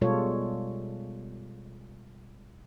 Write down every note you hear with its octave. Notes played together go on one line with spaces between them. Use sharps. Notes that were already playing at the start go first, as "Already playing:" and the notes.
B2 G3 G#3 F4 A4 C#5